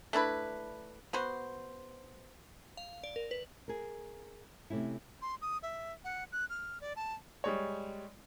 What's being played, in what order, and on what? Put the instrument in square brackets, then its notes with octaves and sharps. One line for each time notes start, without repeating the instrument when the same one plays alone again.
[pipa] A3 D4 E4 B4
B3 F#4 C5
[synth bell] F5
D5
A#4
B4
[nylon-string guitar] G#4 A#4
C3 A3 C#4 E4
[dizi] C6
D#6
E5
F#5
F#6
F6
D5
A5
[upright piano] G3 G#3 C#5